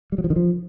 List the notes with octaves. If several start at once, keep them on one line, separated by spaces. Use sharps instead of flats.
G3
F#3
F3
D#3
F3